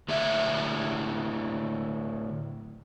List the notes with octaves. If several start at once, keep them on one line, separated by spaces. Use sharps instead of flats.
A2 D3 E4 G4 E5